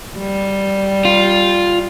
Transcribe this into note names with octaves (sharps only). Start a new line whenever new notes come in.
G3
F4